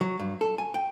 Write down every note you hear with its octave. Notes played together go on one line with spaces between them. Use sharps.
F#3
G2
A4
G#5
G5